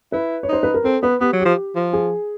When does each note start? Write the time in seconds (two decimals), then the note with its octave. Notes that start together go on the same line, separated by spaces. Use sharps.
0.12 E4 B4
0.43 C#5
0.49 D#4 C5
0.63 B4
0.74 A#4
0.84 C4 A4
1.02 B3 B4
1.20 B3 G4
1.33 F#3
1.40 F3 G4
1.75 F3
1.93 G#4